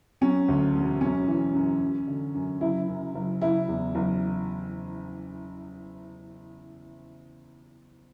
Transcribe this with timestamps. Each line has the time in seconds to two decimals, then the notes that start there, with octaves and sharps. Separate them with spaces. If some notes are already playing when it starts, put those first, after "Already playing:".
0.21 F#3 C#4
0.48 D2
0.75 E1
1.01 F#2 C#4
1.27 E3
1.54 F#2
1.82 F#2
2.08 D3
2.34 F#2
2.61 F#1 E4
2.88 F#2
3.15 F#1
3.41 F#1 E4
3.68 E2
3.95 F#1